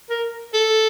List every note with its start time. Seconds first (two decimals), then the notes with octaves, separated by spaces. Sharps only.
0.10 A#4
0.54 A4